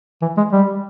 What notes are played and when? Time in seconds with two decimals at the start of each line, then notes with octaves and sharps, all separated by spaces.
0.22 E3
0.37 G#3
0.52 G3